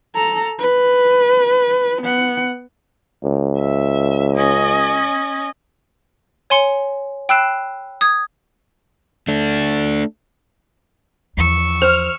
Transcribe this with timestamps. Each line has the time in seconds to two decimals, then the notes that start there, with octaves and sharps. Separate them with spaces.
0.16 A4 A#5
0.59 B4
2.02 B3 F#5
3.24 C#2
3.58 E5
4.36 C#4 D#5
6.50 C#5 G#5 C6 C#7
7.29 G5 B5 E6 F#6 C7 E7
8.01 D#6 G#6
9.28 A3 D4
11.37 E2 F3 C#6 E6
11.82 C5 F6